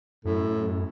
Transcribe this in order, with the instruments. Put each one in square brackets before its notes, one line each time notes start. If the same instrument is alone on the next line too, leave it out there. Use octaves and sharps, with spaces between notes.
[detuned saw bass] F#2 [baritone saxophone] A2 [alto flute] A4